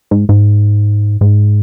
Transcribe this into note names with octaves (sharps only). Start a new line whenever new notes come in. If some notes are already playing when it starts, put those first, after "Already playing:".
G#2
G#2
G#2